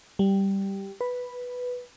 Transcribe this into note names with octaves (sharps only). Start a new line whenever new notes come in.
G3
B4